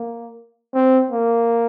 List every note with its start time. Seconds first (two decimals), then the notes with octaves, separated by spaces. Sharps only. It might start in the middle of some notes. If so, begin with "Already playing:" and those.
Already playing: A#3
0.74 C4
1.11 A#3